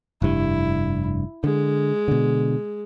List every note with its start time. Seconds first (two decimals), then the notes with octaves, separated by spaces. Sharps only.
0.22 F1 G2 E4
1.44 D3 G#3
2.08 B2 D3